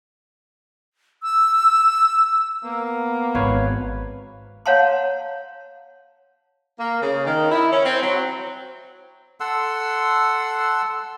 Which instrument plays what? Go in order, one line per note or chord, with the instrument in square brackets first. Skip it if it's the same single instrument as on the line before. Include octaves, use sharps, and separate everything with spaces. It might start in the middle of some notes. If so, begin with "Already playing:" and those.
[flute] E6
[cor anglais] A#3 [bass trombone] B3
[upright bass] G#1 [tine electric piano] B4 C#5 F5
[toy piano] C#5 F5 F#5 A5 A#5 C6
[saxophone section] A#3
C#3
D#3
E4
C#4
C4
F#3
[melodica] A4 F#5 C6 E6